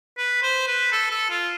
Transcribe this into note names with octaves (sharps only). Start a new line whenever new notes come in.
B4
C5
B4
A4
A4
F4